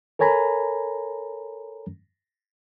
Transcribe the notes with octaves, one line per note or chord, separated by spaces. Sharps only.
A4 A#4 C#5 G#5 A#5 B5